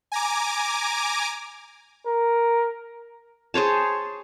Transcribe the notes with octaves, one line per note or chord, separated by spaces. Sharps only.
G#5 A#5 D6
A#4
G#4 C5 C#5 A5